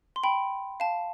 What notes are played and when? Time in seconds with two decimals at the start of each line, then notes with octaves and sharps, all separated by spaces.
0.16 C6
0.24 G5 B5
0.80 F5 A5